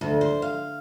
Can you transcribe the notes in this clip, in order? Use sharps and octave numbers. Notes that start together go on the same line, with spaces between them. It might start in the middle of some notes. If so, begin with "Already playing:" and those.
D2
C5
F5